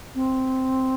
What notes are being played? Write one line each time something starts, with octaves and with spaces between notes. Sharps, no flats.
C4